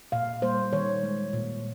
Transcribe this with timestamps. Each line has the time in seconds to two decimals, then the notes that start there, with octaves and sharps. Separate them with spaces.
0.12 A#2 F5
0.42 G3 A#3 C5
0.73 D#3 C#5
1.03 G#3
1.33 A#2